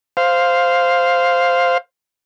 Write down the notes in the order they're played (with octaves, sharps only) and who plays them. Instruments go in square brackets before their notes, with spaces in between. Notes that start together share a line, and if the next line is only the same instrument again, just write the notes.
[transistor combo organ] C5 F5